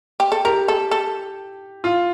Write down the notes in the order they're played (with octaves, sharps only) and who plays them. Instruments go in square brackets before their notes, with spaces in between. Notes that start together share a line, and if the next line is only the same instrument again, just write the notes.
[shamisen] G4
A4
[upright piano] G4 [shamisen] A#4
[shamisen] A4
A4
[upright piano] F4